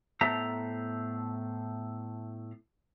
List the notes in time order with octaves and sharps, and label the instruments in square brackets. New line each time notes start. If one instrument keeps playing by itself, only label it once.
[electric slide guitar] A2 B3 A4 C5 E5 A#5